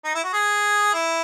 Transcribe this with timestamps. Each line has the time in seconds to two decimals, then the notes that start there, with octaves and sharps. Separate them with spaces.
0.05 D#4
0.15 E4
0.24 F#4
0.33 G#4
0.94 E4